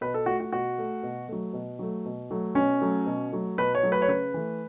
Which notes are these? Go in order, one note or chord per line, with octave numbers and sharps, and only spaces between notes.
B2 B4
A4
A3 F#4
F#4
B2 F#4
A3
B2
F#3 A3
B2
F#3 A3
B2
F#3 A3
B2 C#4
F#3 A3
B2
F#3 A3
B2 B4
C#5
F#3 A3
B4
C#5
C#3 B4
E3 A3